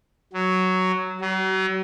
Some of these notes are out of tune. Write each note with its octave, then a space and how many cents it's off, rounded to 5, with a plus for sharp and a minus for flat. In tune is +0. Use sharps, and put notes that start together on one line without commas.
F#3 +5
F#3 +40